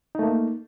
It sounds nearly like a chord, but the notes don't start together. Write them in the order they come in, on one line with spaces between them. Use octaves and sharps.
D#4 A3 A#3